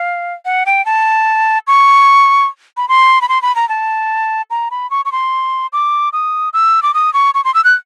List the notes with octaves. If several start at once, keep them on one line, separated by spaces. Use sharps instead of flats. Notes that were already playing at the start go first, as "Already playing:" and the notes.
Already playing: F5
F#5
G5
A5
C#6
B5
C6
B5
C6
B5
A#5
A5
A#5
B5
C#6
C#6
C6
D6
D#6
E6
D6
D#6
C#6
C#6
C6
E6
F#6